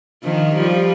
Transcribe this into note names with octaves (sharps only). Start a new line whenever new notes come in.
D#3 F3
F3 G3